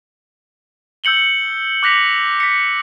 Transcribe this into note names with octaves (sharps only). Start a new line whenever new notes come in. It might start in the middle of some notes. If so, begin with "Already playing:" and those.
E6 G6 C#7 F#7 G7
D6 F#6 A#6 B6 F7
B6 C#7